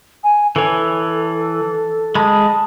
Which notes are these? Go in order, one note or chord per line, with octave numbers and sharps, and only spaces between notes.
G#5
E3 A4 C#5
G#3 A5 B5 D#6